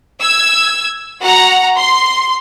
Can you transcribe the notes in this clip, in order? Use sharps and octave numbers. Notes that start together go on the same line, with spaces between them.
E6 G#6
F#4 F#5 A#5
C6